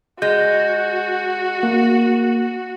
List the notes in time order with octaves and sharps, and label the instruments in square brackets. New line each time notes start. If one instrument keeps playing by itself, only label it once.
[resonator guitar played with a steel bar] G#3 [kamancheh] F#4 [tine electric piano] G6
[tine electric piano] A#3